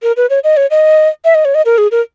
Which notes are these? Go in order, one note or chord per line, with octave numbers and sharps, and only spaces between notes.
A#4
B4
C#5
D#5
C#5
D#5
E5
D#5
C#5
D#5
A#4
G#4
A#4